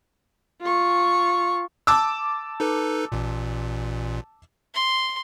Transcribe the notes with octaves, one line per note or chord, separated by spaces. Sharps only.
F4 C#6
A5 D6 E6
D#4 A4 B4
A1 A#2
C6